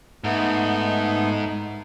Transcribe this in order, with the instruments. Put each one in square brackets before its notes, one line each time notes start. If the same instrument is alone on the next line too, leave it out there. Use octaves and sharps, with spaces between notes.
[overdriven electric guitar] G#2 [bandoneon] A3 B3 D#4